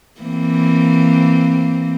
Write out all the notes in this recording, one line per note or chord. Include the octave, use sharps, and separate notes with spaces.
E3 A#3 C4